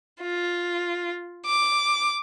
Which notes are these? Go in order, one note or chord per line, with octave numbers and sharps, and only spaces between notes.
F4
D6